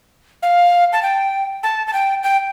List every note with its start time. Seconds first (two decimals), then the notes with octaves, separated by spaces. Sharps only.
0.43 F5
0.93 A5
1.03 G5
1.63 A5
1.87 A5
1.93 G5
2.23 G5